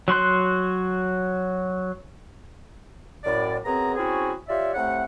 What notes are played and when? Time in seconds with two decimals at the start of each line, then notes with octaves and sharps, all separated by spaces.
0.08 F#3 F#4 C6 F#6
3.24 F#2 A2 D5
3.65 F#2 B3 C4 G#4 A#5
3.96 C4 C#4 E4 F#4 G#4
4.49 F4 G4 C#5 D5 E5
4.74 A2 C3 A3 C4 F#5